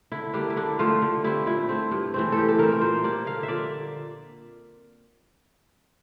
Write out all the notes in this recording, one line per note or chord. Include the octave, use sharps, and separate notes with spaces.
D3 E4
G3 A#3 D4
E4
D3 D4
F3 A3 C4 F4
D3
G3 C4 E4
A#2 E4
A3 C4
G2
E3 A3 C4
A2 G4 A4
A4
E3 A3 C4 A#4
A#4
A#2 C5
G3 A#3 D5
D3 F5
E5
F3 A#3 D5